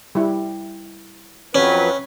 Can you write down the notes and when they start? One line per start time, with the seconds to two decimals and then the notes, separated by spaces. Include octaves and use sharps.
0.15 G3 E4
1.55 F2 F#3 C#4 B4